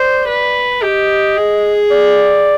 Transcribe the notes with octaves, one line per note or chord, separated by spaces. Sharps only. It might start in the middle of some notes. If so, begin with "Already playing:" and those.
Already playing: C5 D5
B4
G4 D#5
G#4
D5